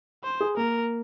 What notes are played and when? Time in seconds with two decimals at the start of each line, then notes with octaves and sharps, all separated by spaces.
0.24 C5
0.41 G#4
0.57 A#3 A#4